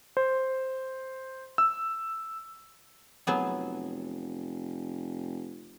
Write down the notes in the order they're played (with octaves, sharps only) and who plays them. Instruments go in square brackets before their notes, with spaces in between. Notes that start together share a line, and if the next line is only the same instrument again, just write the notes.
[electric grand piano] C5
E6
[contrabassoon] F1 [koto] F#3 B3 G#4